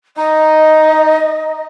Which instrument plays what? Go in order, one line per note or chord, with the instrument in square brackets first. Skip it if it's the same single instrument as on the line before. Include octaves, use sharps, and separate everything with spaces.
[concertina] D#4 [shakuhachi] D#5